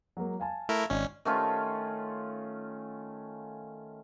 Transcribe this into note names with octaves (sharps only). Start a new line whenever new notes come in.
F#3 G#3 A#3
F5 G#5 A5
A3 E4 A#4
G#1 C#4 D5 D#5 G#5
D#3 A3 C#4 F4